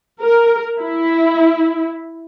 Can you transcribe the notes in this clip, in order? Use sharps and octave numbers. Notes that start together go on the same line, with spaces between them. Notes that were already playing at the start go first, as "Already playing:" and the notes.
A#4
E4